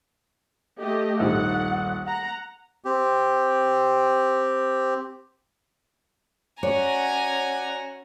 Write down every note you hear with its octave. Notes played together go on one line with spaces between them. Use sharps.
A3 G4 D#5
D#1 A#1 D#4 F#5
F#5 A#5
C4 G4
C#4 F#4 C#5 D5 F#5 G#5 A#5